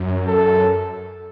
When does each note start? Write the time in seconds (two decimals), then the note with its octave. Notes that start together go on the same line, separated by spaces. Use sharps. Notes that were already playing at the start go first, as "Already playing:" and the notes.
Already playing: F#2
0.27 A4